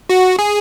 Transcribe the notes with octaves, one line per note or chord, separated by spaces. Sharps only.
F#4
G#4